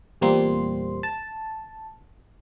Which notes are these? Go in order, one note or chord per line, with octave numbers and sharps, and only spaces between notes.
E2 A#2 G3 A#3 C4 C6
A5